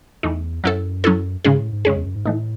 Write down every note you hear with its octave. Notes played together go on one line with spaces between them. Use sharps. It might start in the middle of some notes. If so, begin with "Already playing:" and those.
E2 E3 A3 D#4
F#2 F#3 C#4 E4 A4
F#3 C#4 E4 A4
G#2 C#3 G#3 C#4 G#4
A2
G#2
F#2 C#3 G#3 C#4 G#4
E2
F#2
G#2
A2 E3 A3 D#4